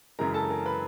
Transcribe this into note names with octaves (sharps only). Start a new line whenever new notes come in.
F#2 C#3 E3 G#3 A#4 A#5
A4 A5
A#4 A#5
B4 B5